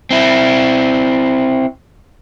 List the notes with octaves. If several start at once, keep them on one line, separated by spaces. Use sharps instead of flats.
C4 E4